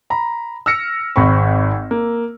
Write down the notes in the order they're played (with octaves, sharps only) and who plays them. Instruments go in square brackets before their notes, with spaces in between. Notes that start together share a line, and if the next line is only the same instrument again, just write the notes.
[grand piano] A#5 B5
E6 F6 A#6 C#7
G#1 G#2 C4 B5 C#6
A#3